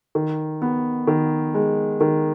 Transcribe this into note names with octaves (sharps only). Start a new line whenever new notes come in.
D#3
B3
D#3
G#3
D#3